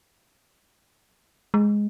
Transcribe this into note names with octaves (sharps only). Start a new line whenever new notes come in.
G#3